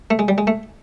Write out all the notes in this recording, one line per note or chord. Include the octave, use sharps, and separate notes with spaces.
A3
G#3
G3
G#3
A3